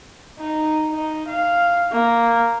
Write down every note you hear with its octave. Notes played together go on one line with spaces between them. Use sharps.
D#4
D#4
F5
A#3